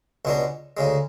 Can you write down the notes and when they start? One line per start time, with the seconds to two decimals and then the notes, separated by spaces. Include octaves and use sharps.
0.25 C#2 B2 G#3 B3 D4
0.77 D2 C#3 G#3